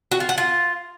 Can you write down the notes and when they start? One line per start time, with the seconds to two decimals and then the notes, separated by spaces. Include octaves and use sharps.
0.12 F#4
0.20 F4
0.29 F#5
0.38 F4